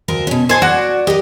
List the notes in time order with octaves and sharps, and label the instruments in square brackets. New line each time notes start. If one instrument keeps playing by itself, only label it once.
[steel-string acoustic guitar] D2 A#4 C5
B2 C#4
[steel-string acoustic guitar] A4 D#5 [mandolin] C5 G#5 C6
[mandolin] F#4 [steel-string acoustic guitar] D5
[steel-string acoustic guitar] G4 A#4 [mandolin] D#5